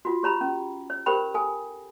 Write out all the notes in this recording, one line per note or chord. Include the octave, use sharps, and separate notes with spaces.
F4 F#4
G4 C#5 A#5 B5
C#4
C#5
G4 A#4 C5 G5 B5
A4 G#5